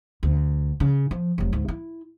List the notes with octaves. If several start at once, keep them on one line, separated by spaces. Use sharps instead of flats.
D2
C#3
F3
F1 F#3
D2 G#2
E4